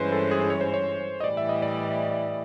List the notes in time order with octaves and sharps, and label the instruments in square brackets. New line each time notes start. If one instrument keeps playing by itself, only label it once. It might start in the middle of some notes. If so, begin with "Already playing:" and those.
Already playing: [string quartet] G2 E3 G#3 C#4 [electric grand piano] B4 C5
[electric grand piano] A4
G#4
C#5
C5
C#5
D#5
[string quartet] A2 E3 G3 [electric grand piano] D5
[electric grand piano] E5
D#5
D5